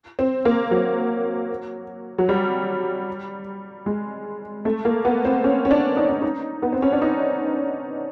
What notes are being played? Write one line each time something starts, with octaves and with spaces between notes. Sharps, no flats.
C4
A#3
F#3
F#3
G3
G#3
A3
A#3
B3
C4
C#4
C#4
D4
D#4
D4
D#4
B3
C4
C#4
D4
D#4